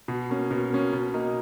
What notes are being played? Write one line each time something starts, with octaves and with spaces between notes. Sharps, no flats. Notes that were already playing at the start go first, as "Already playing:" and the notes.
B2
A#3 C#4
B2
A#3 C#4
B2
A#3 D#4